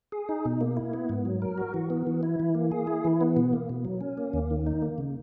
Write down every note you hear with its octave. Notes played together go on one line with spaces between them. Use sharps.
G#4
D#4
B2
A#3
E4
B3
G#2
F#3
A#4
F#4
E3
B3
E3
E4
E3
A#3
G#4
E4
E3
B3
B2
A#3
B2
F#3
C#4
A#3
D#2
D#3
D#4
A#3
C#3